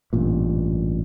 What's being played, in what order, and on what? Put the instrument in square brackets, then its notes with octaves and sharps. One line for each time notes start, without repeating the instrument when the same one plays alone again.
[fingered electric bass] A1 G2 A#2